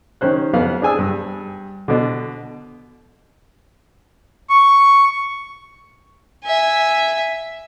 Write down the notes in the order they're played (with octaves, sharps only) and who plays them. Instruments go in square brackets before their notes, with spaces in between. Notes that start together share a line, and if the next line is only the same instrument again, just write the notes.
[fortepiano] D#3 C#4 C5 F#6
F2 B3 F5 F#6
D4 G#4 G#5 E6
G2
B2 D3
[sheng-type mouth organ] C#6
[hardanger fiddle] E5 G#5